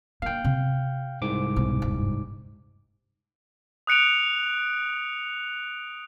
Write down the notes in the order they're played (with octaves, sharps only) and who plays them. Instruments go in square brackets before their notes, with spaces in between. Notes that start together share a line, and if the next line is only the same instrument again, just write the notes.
[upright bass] A#3 D4 [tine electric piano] F5 G5
[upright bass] C3
[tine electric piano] C2 G#2 D6
[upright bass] B1
D#1 G2
[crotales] D#6 F#6 C#7 D7 F7